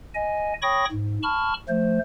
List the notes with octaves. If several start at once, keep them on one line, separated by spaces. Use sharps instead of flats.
D#5 G#5
C#5 G5 B5 C#6 D#6 A#6
G#2
A5 B5 C#6 F6
F3 A3 C5